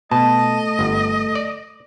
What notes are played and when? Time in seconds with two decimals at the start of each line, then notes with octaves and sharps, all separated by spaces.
0.11 B2 A3 D#5 A5
0.79 G1
1.35 D5